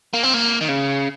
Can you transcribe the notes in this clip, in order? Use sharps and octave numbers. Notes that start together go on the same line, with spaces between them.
A#3
C4
A#3
D#3
C#3